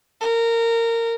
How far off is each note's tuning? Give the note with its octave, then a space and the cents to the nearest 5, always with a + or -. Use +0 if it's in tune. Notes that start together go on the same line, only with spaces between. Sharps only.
A#4 -20